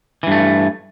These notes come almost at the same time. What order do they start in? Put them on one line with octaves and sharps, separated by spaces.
E3 G2 A3